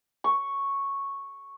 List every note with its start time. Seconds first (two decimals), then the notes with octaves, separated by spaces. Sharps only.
0.24 C#6